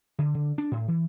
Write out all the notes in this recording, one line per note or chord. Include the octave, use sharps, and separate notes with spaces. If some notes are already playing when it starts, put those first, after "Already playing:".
D3
D3
D4
A2
E3